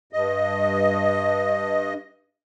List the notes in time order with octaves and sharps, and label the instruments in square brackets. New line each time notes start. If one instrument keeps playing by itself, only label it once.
[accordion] G2 D#5